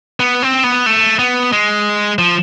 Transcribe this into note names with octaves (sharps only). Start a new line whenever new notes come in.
B3
C4
B3
A3
B3
G#3
F3